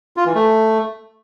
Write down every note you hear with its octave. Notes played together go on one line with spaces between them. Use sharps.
F4
E3
A3